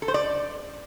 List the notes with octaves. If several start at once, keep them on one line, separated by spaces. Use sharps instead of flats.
A4
C5
D5